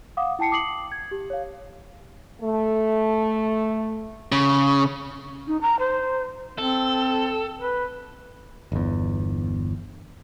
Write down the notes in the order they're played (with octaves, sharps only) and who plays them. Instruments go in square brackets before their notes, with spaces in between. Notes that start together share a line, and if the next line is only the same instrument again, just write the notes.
[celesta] F5 F#5 D6 D#6
E4 G5 A5 C7 C#7
D6 D#6 C7 C#7 F#7
G#6
G4
C#5 F5
[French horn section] A3
[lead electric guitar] C#3
[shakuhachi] D#4
A#5
C5
[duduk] C4 [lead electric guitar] A4
[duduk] B4
[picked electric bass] G1 E2